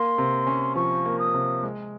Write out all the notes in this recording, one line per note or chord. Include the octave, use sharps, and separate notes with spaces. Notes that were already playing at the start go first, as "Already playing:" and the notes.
Already playing: A#3 C6
C3
C#4
F3 C#6
A#3
D#6
C3
G#3